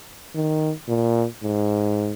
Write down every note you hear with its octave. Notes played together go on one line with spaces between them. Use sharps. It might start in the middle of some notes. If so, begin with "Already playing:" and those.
D#3
A#2
G#2